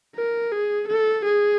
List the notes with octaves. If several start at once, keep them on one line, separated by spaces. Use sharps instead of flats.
A#4
G#4
A4
G#4